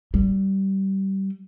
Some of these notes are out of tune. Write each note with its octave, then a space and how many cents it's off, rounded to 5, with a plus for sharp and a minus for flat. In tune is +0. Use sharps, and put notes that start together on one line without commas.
G3 -20